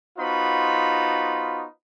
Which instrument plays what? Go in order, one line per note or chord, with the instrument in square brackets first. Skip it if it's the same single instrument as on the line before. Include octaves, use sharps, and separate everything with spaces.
[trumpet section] B3 D#4 F4 F#4 C5 B5